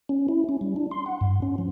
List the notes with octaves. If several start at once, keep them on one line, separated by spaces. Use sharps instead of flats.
C#4
E4
C#4
G3
D4
C6
F#5
G2
C#4
F3